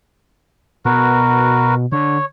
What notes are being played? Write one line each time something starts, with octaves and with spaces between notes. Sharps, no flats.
B2 F#4 A#4 B4
D3 C#5